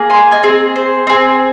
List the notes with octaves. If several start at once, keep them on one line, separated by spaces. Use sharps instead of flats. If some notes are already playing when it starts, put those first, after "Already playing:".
Already playing: A#3 G#4
G#5 C6
D#5 G#5
C4 G#4
C5
C4 G#4